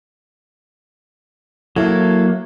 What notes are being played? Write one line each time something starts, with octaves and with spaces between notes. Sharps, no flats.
F#3 A#3 E4 A4